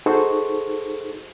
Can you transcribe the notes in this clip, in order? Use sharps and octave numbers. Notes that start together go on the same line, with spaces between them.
D#4 F#4 G#4 A4 C5 C#6